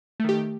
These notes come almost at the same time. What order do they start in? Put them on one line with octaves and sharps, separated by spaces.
A3 D#3 G4